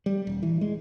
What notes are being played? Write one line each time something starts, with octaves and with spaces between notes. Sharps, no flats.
G3
D#1
E3
G#3